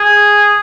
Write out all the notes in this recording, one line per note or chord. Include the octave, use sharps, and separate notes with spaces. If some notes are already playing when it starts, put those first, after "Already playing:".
Already playing: G#4